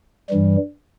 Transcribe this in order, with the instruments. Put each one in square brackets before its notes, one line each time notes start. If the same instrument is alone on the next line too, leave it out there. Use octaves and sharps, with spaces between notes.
[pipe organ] G2 E3 G3